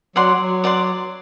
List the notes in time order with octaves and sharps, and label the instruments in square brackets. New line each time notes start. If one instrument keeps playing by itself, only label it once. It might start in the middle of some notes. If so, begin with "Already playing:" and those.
[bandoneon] F#3 [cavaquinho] D5 F#5 C6
[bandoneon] F#3
[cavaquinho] D5 F#5 C6